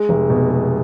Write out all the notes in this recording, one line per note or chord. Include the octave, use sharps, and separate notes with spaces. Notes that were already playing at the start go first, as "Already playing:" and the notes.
Already playing: G#3
F1
B2
G#3